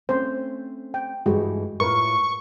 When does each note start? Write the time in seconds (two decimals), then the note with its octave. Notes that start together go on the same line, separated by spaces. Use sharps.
0.09 A3 C4 C#4 C5
0.94 G5
1.26 G2 E3 G#3 A3 F#4 G4
1.80 A2 F4 A#4 B4 C#6